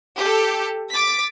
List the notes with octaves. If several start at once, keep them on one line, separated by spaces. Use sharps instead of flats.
G4 A4
D6 A6 B6